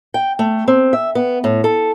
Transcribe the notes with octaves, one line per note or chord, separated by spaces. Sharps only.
G5
A3
C4
E5
B3
A2
A4